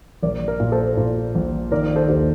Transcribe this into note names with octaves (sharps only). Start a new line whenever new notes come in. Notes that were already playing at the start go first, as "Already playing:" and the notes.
A#1 A#4 D5
A#4
A#2
A4 C5
A#2
A#1
D#3 A#4 D5
A4 C5
D#2